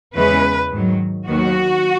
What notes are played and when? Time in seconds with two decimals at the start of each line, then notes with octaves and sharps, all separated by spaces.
0.15 E2 C#3 E3 G#3 C#4 B4
0.71 G#2 D#3 F#3
1.27 D#2 D#3 F#3 B3 F#4